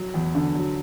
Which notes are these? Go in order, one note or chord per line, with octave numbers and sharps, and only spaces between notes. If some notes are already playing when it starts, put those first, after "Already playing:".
Already playing: F#3
E2
D3
F#3